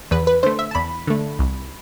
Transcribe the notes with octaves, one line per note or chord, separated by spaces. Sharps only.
E2 B4
B4
D3 A3 C5
E5
A5
E2 B5
D3 A3
C2